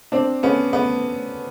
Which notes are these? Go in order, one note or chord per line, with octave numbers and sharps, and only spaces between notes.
C4 D4
B3 C#4
B3